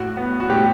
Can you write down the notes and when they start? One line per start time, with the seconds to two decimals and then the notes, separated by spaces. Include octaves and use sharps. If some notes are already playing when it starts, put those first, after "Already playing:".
Already playing: A2 F#4
0.17 B3
0.40 F#4
0.50 A2 G4